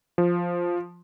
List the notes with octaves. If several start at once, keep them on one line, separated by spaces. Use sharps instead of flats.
F3